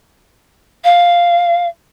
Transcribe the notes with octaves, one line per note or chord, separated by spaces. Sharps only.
F5